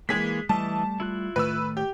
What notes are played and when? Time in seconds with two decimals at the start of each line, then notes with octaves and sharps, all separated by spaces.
0.09 E3 G#3 A#3 G#4 B6
0.49 E3 G3 A3 D#5 A5
1.00 E4 F4 F#6
1.36 A2 D#3 A3 B4 E6
1.77 G4